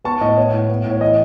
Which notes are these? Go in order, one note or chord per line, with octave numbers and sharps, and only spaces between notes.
B3 A5 C#6
A2 D#5
B3 C#5
A2
B3
A2
C#5
E3 D#5